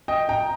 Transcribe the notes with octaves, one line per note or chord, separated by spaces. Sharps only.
D#5 G5
G5 A#5